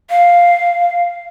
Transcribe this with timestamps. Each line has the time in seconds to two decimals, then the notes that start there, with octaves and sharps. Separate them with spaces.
0.10 F5